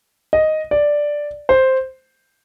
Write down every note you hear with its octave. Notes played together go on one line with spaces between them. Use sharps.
D#5
D5
C5